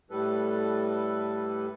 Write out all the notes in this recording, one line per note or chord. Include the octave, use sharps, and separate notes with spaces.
A2 G3 A4 B4